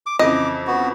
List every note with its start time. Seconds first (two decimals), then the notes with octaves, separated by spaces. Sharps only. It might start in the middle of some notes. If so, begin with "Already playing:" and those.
0.06 D6
0.19 F2 C#3 E3 D#5 D6
0.67 B3 F#4